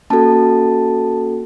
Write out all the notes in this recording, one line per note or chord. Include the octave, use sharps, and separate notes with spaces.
A#3 C#4 F#4 A4 A5